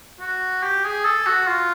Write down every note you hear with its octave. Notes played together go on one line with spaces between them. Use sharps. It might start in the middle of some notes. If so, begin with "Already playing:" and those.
F#4
G4
G#4
A4
F#4
F4